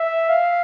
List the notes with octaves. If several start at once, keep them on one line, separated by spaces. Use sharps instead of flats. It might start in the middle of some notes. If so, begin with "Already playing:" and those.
Already playing: E5
F5